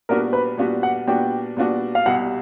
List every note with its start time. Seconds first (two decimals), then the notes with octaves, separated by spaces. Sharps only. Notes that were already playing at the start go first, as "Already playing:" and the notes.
0.09 A#2 G3 B3 D4 F#4 A#4
0.33 B4
0.57 A#2 G3 B3 D4 F#4
0.83 F#5
1.07 A#2 G3 B3 D4 F#4 G5
1.57 A#2 G3 B3 D4 F#4
1.95 F5
2.06 C2 B2 G3 F#5